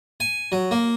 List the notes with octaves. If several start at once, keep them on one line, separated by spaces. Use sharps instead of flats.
G#5
F#3
A#3